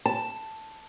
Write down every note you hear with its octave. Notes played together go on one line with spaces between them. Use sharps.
A5